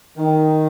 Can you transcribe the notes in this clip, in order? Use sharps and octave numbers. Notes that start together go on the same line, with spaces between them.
D#3